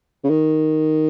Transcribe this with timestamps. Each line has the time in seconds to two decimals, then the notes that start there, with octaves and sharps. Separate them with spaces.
0.24 C#3
0.30 D#3